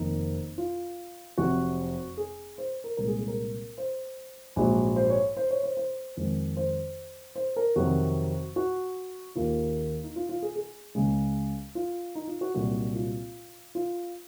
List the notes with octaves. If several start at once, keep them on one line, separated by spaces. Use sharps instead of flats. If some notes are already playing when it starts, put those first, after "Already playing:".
Already playing: F1 F2 D#3 A#3 D#4
F4
F1 F2 C3 F#3 F#4
G#4
C5
A#4
C2 A#2 G#3 A#4
G#4
G#4
A#4
C5
A#1 G#2 F#3
C5
C#5
C5
C#5
C5
C5
F2 D#3 G#3
C5
C5
A#4
F2 C3 D#3 F#3 F#4
F#4
D#2 D#3 A#3 F4
D#4
F4
F4
G#4
G#4
C#2 C#3 G#3
F4
D#4
F4
F#4
C2 A#2 F#3 F#4
F4
F4